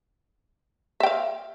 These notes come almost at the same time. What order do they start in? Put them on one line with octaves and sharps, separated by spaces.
E5 G5 F5